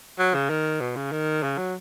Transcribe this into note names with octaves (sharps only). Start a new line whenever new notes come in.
F#3
C#3
D#3
B2
C#3
D#3
C#3
F#3